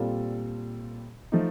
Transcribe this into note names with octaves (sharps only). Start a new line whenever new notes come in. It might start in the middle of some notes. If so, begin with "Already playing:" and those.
Already playing: A#2 G3 C4 F4 A4
F3 A3 D#4